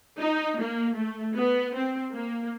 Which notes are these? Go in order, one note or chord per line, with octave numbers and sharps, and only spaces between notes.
D#4
A#3
A3
B3
C4
A#3